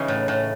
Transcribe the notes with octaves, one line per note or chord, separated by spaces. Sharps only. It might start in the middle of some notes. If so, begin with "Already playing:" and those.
Already playing: C#3 E3 C#4 D#4
A2
A2